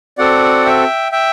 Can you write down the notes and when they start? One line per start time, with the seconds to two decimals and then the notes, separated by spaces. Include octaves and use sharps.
0.18 C4 F#4 A4 D5 F#5
0.65 E5 G5
1.12 E5 G5